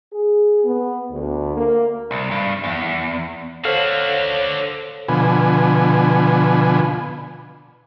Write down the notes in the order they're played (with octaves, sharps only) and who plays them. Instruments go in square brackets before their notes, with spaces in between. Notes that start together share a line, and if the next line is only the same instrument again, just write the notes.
[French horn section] G#4
B3
D2
A#3
[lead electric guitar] C2
G2
E2
[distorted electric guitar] D3 F#4 [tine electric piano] A4 C5 [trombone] C#5 [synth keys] F5
[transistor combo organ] B2 D3 F3 B4 G#5